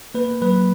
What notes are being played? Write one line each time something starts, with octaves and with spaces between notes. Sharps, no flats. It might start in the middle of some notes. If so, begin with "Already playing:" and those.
A#3 B4
F#3 B4